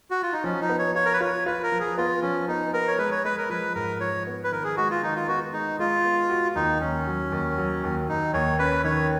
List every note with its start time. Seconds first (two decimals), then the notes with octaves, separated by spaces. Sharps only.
0.11 F#4
0.23 F4
0.33 D#4
0.44 F3 C#4
0.61 D#4
0.69 B3
0.79 C#5
0.95 F4 C#5
1.05 A#4
1.13 B4
1.21 F4 C#5
1.46 F4 B4
1.63 A#4
1.72 F3
1.80 G#4
1.97 B3 F4
2.22 F3 C#4
2.48 B3 D#4
2.73 B3 A#4
2.88 C#5
2.98 G#3 B4
3.11 C#5
3.25 G#3 B4
3.38 A#4
3.49 F3 B4
3.75 G#2 A#4
4.00 F3 C#5
4.27 B3
4.44 B4
4.52 D#3 A#4
4.64 G#4
4.77 G#3 F#4
4.90 F4
5.03 D#3 D#4
5.15 F4
5.28 B3 F#4
5.53 G#3 D#4
5.79 G#3 F4
6.05 B3
6.30 F#4
6.55 D#2 D#4
6.81 D#2 C#4
7.07 F#3
7.32 D#2
7.58 F#3
7.84 D#2
8.08 D#2 D#4
8.33 D#2 C#5
8.59 C#4 B4
8.84 D#3 C#5